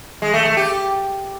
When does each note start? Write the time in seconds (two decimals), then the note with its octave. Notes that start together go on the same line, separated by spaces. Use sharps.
0.22 G#3
0.34 A3
0.45 A3
0.57 G4